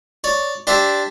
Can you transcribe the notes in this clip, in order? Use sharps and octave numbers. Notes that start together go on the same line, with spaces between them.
C#5 D5
D4 G4 C5 D5 E5